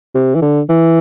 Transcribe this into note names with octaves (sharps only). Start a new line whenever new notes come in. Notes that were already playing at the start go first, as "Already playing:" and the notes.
C3
E3
D3
E3